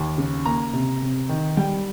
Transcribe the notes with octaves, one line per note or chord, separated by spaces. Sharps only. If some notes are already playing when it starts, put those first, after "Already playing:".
Already playing: D#2
C#3
A#3 A#5
C3
C3
D#3
G3 G5